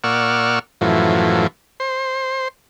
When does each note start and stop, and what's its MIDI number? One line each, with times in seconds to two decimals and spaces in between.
0.04 0.59 46
0.04 0.59 74
0.04 0.59 78
0.04 0.59 85
0.04 0.59 88
0.04 0.59 89
0.81 1.47 42
0.81 1.47 45
0.81 1.47 52
0.81 1.47 53
1.80 2.48 72